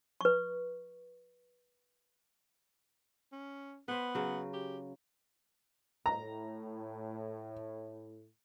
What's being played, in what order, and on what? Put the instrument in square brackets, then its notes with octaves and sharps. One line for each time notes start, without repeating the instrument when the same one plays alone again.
[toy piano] B4 C#6
[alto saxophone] C#4
[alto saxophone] B3 [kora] B4 C5
[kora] C#3 F#3
[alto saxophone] G4
[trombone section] A2 [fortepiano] A#5